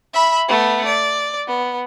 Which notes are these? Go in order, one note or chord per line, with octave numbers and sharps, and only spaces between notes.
E5 B5
A3 B3
D5
B3